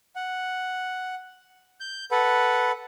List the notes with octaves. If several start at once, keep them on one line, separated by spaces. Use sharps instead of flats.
F#5
G6
A4 B4 F#5